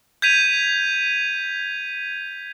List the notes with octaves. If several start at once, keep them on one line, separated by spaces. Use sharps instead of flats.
G6 G#6 B6 D#7 F7